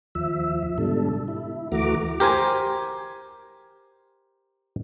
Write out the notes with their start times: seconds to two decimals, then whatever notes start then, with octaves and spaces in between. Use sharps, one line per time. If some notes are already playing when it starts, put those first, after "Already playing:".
0.15 D#2 F3 E5
0.78 G#2 B2 D3 G3 A4
1.28 E4
1.72 D2 E3 A3 F#4 A#5 D6
2.20 G4 A#4 C5 G#5